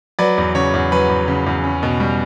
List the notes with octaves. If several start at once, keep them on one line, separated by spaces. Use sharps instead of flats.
F#3 B4 D5
E2
C#3 C#5
E2
F#3 B4
E2
C#3
E2
C#4
B2
G3